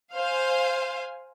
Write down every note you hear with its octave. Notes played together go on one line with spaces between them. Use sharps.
C5 F5 G#5